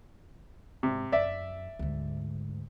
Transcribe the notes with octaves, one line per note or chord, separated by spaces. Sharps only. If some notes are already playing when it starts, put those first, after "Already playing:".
G#2 C3
F#2 D5 E5
D2 G#2